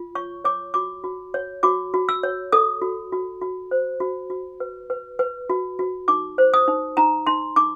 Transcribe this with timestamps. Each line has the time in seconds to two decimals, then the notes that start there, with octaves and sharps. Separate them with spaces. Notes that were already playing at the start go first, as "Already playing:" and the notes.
Already playing: F4
0.15 C#5 C#6
0.45 C#5 D6
0.74 F#4 D6
1.04 F#4
1.34 C#5
1.63 F#4 D6
1.94 F#4
2.09 E6
2.23 C#5
2.52 A4 D#6
2.82 F#4
3.12 F#4
3.42 F#4
3.71 C5
4.00 F#4
4.30 F#4
4.60 B4
4.90 B4
5.19 B4
5.50 F#4
5.79 F#4
6.08 D#4 D6
6.38 C5
6.54 D#6
6.68 D#4
6.97 D#4 A#5
7.27 D#4 C6
7.56 D#4 D6